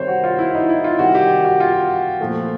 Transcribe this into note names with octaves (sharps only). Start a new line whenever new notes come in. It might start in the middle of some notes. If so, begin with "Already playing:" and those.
Already playing: C3 D#3 G3 C5 C#5
F#4
F4
E4
D#4
E4
F4
C3 D#3 G3 F#4
G4
F#4
F4
A#2 F3 A3